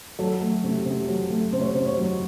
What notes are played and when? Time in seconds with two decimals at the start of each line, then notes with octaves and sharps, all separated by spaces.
0.19 F#3 A4
0.41 A3
0.64 C3
0.86 C3
1.08 F#3
1.30 A3
1.53 C3 C5
1.61 C#5
1.70 C5
1.75 C3
1.86 C#5
1.98 F#3